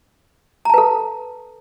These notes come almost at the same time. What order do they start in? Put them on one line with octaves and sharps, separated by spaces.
A#5 A5 B4 A4